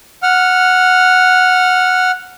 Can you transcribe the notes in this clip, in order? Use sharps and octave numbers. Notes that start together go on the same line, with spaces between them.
F#5 F6